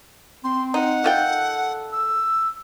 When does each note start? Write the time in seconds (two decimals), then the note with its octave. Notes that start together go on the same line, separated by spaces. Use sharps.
0.44 C4 C6
0.74 D#4 F#5
1.04 D#3 F4 A4 G5
1.92 E6